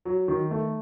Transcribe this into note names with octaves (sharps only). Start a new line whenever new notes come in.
F#3
D#3
A3